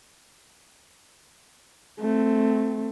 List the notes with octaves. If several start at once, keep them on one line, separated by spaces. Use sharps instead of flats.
A3 C4